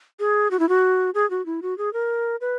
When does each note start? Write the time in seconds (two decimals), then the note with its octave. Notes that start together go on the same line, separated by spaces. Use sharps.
0.20 G#4
0.51 F#4
0.59 E4
0.69 F#4
1.14 G#4
1.30 F#4
1.46 E4
1.62 F#4
1.78 G#4
1.93 A#4
2.41 B4